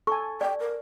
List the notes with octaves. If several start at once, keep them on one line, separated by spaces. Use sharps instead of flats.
A4 G#5 C#6
D5 G5
A#4